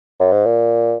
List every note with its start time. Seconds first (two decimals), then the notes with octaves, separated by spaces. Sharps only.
0.20 F#2
0.32 G#2
0.46 A#2